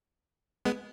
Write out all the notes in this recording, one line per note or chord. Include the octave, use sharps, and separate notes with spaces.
G#3 B3